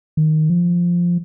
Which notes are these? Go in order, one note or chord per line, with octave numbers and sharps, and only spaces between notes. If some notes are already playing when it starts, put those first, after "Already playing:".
D#3
F3